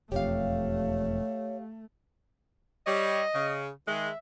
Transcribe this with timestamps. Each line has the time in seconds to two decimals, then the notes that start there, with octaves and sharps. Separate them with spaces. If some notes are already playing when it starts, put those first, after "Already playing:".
0.12 E1 F2 A3 G4 C#5 F5
2.86 G3 C#5 D#5
3.35 C#3
3.88 D#3 G#3 E5